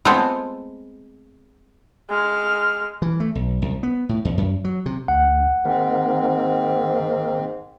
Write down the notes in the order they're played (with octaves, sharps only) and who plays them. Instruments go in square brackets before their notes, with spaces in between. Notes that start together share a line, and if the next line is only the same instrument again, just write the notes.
[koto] G#3 A3 B3 C4 F4 A4
[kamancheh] G#3 F6
[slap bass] E3
A3
B1
C2
B3
A2
E2
F#2
F#3
C3
[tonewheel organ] D2 [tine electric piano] F#5
[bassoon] G#2 [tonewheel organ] D#3 A#3 [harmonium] C4